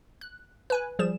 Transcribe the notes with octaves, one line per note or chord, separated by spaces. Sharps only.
F#6
B4 G#5 F#6
F3 G3 G#4 E7